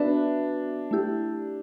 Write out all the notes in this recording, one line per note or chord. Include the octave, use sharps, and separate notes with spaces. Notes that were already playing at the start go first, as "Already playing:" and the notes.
Already playing: B3 D4 F#4 B4 E5
A3 E4 G4